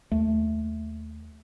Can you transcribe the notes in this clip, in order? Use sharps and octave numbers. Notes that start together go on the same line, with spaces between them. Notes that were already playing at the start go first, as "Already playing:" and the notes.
D#2 A3